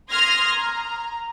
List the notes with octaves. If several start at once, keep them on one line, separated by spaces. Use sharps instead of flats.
C6 D#6 F6 G#6 A#6
A#5